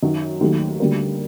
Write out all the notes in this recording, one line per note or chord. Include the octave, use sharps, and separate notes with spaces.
F#2 D#3 F#3
D#2 D#3 F#3 A3
D2 D3 G3 A#3